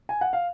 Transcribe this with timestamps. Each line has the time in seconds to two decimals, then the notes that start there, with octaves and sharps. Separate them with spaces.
0.09 G#5
0.21 F#5
0.33 F5